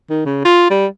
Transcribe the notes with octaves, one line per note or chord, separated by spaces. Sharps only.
D#3
C#3
F4
G3